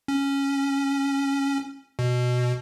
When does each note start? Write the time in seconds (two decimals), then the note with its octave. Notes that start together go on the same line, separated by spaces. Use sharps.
0.08 C#4
1.99 B2